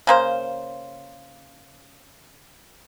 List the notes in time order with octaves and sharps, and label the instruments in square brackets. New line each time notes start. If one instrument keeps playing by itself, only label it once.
[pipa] C#3 A#3 C5